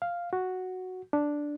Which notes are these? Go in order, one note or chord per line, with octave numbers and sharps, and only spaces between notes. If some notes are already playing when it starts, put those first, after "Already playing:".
F5
F#4
D4